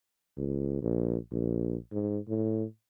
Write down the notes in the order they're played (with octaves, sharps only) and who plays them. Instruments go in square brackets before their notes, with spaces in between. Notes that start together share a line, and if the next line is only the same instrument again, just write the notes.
[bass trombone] C#2
A#1
A#1
G#2
A2